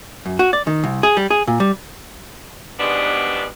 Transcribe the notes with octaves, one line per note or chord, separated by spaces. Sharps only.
F#2
F#4
D5
D#3
C2
G#4
G3
G#4
A#2
G3
G#2 B2 G3 G#3 B3 D4